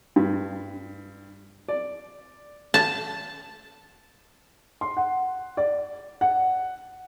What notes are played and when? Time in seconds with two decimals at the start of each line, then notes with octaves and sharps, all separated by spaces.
0.16 G2
1.69 D5
2.74 A5
4.81 C6
4.97 F#5
5.57 D5
6.21 F#5